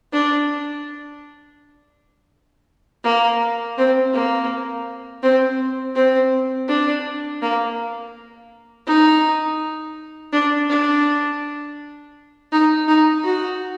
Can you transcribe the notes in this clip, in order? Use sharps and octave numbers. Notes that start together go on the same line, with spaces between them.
D4
A#3
C4
A#3
C4
C4
D4
A#3
D#4
D4
D4
D#4
D#4
F#4